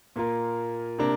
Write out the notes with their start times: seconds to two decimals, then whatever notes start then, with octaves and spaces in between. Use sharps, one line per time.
0.16 A#2 A#3 F4 A#4
0.99 C3 A#3 D4 A#4